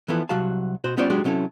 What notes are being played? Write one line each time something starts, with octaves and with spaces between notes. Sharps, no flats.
E3 F3 B3 E4 A4
C2 C3 F#3 F#4 F5 A5
B2 F#4 C5
G3 B3 C#4 F4 C5 D5
F#3 G#3 D4 F#4 G4
C3 F#3 C#4 E4 A4